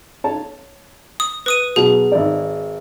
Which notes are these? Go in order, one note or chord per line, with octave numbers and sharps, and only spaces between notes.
C#5 A5
D#6
B4 D#6 D#7
B2 F#3 G#4
G#1 D5